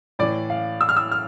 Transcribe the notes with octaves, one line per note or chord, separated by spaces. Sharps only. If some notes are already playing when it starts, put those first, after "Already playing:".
A2 E3 D5
F5
E6
F6
E6
F6